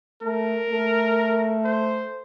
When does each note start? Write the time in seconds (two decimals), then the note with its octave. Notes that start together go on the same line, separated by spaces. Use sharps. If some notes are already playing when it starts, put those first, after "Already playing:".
0.22 A3 A#4
0.70 A3
1.65 C5